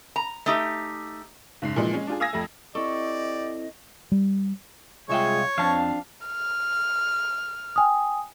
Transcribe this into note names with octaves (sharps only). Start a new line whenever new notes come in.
A#5
A3 D#4 G4
F#1 G#2 C7
A#2 E3 F3 G#3 D#4
G#3 C#4
D4 F4 G#4
F5 G#5 D#6 E6 G#6 A#6
F2 A3
C4 E4 G4 A4 D5 D#5 C#6
G3
C2 G#3 F4 C#5 E5 G5
F2 F3 C4 D4 F5 A5
F6
G5 G#5 D#6